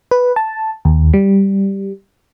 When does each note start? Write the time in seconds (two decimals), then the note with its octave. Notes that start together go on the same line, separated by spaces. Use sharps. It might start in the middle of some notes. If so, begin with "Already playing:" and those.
0.11 B4
0.36 A5
0.85 D#2
1.14 G3